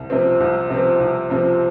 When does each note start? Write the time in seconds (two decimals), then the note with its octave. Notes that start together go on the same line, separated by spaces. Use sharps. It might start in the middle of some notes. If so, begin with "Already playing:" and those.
Already playing: C2
0.10 C3 F3 C4
0.40 C2
0.70 C3 F3 C4
1.00 C2
1.30 C3 F3 C4